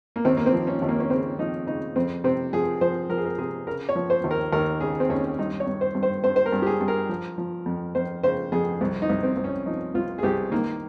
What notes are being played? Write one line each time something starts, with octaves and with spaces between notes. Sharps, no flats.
A#3
D#2 C4
A#3
C4
F3
C#4
D#2
A#3
C#4
C#3 C4
F3 D#4
C#3 D#4
F2 C4
C3 C4
F3 G#4
F3 C5
F3 A#4
G#4
A#4
C3 G#4
C#3 A#4
C#5
F3
C5
D#2
A#4
D#2 A#4
C#3 G#4
C4
D#2 C#4
G2 D#4
C#5
G2
C5
G2
C5
G2 C5
C5
A#4
G2
G4
G#4
G2
A#4
F3
F3
F2
F2 C5
C#3 C5
F2 G#4
C2
D#4
C2
C4
C2
C#4
F3 D#4
C2 F4
G#4
C2 G4
D#3 A#3